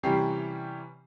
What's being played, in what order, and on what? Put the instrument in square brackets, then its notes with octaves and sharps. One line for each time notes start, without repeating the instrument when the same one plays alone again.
[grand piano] C3 E3 G3 C#4 G4 C7